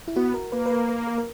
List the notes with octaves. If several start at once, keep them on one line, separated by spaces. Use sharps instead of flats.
E4
B3 F#4
A#4
A#3 B4
B4
A#4
B4
A#4
A#4